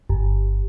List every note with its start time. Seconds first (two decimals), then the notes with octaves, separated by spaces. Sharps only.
0.09 G1